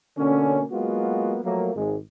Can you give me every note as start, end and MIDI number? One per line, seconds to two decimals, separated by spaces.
0.17 0.63 47
0.17 0.63 50
0.17 0.63 58
0.17 0.63 61
0.72 1.39 54
0.72 1.39 56
0.72 1.39 58
0.72 1.39 59
0.72 1.39 65
0.72 1.39 66
1.45 1.73 53
1.45 1.73 54
1.45 1.73 57
1.45 1.73 58
1.76 1.97 32
1.76 1.97 56